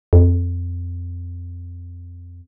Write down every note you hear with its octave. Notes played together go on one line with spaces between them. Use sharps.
F2